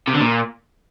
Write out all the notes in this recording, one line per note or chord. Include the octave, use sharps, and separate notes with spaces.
C3
D3
A#2